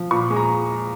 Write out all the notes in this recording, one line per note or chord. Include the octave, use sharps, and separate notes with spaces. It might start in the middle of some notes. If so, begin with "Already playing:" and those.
Already playing: F3
A#2 C#6
G#3
A#5